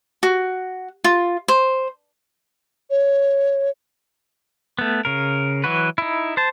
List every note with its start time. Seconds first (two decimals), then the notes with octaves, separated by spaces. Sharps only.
0.23 F#4
1.04 F4
1.48 C5
2.90 C#5
4.79 A3 B3
5.05 C#3 A#4
5.64 E3 F#3 F#4 B4
5.98 D#4 E4
6.37 C5 A5